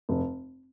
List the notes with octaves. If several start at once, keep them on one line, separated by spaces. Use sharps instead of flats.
F1